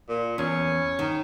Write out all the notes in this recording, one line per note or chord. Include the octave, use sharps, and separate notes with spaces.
A#2
E2 C#4
D#3